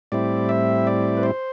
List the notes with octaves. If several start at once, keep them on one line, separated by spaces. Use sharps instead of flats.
A2 G3 C4 E4 D5
E5
D5
B4
C5